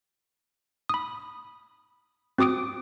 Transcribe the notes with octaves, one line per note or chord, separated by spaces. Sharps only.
B5 D#6
C4 F#4 D6 D#6 D7